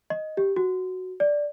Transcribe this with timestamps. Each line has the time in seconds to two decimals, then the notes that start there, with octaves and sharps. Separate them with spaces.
0.10 D#5
0.37 G4
0.56 F#4
1.20 D5